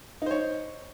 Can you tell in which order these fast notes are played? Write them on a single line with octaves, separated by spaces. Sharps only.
D#4 C5 C#5